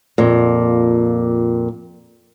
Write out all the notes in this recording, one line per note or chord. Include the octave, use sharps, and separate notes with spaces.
F2 A#2